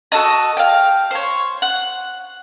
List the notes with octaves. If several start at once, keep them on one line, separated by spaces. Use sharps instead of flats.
F#4 A4 A#4 D#5
F5 G5
C5 C#5
F#5